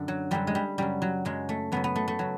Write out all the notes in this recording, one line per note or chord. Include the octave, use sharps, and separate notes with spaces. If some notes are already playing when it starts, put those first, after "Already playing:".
Already playing: F#2 D3
F#3
F#2 D3 F#3 G3
G#3
G3
F#2 C#3 F#3 G3
F#3
F#2 C#3 F#3 G#3
A3
F#2 C#3 F#3 B3
B3
A3
A3
C#3 F#3